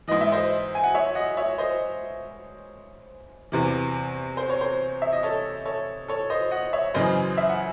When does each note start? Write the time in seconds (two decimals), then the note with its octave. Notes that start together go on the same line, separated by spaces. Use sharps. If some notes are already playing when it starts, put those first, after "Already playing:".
0.08 G#2 E3 D#5
0.21 E5
0.32 C5 D#5
0.75 G#5
0.84 F#5
0.95 C#5 E5
1.15 D#5 F#5
1.37 C#5 E5
1.58 C5 D#5
3.52 E2 C3 E3
4.37 C5
4.50 C#5
4.61 C5
5.02 E5
5.13 D#5
5.23 A4 C#5
5.65 A4 C#5
6.08 A4 C#5
6.30 C5 D#5
6.51 D#5 F#5
6.73 C#5 E5
6.94 F#2 C#3 E3 C5 D#5
7.37 E5
7.49 F#5